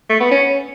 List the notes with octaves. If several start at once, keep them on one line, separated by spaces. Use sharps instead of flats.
A3
B3
C#4